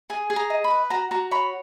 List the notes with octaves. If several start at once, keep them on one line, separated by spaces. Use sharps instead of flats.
G#4 G#5
G#4
A#5
D#5
B5
B4
F#4 A#5
F#4 A#5
C#5 B5